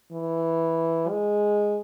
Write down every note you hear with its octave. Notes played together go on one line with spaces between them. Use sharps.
E3
G#3